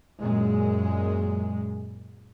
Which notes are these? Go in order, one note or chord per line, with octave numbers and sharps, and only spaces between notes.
F#2 A#2 G#3